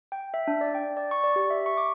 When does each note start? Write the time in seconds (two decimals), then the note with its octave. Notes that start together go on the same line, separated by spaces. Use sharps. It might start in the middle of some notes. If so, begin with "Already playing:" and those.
0.12 G5
0.34 E5
0.47 D4
0.61 D5
0.75 G5
0.97 D5
1.11 C#6
1.24 D5
1.36 G4
1.50 E5
1.66 C#6
1.77 D6